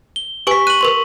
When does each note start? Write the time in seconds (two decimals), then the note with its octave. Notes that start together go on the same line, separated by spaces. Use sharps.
0.16 G7
0.47 G4 B4 G#5 C#6 B6
0.67 F#6 D#7 F#7
0.81 A#4 B4 C6